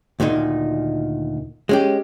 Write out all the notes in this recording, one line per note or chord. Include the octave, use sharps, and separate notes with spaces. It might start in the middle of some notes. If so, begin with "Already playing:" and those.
D2 A#2 D#3 D#4
G#3 C#4 G4